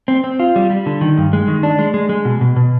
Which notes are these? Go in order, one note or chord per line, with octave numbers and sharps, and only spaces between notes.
C4
C4
F4
G3
G3
D3
D#3
G2
G#3
D#3
D4
G#3
G#3
G#3
B2
B2
B2